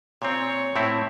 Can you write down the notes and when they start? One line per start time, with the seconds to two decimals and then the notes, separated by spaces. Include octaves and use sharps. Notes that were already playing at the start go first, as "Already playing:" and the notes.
0.22 A#2 C4 C#5
0.76 A2 C4 E4